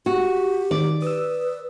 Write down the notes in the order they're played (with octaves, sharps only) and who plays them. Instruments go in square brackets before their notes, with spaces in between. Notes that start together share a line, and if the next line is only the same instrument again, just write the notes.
[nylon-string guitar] F#4 [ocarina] G4
[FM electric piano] D#3 [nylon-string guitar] D5
[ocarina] B4 [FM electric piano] D#6 E6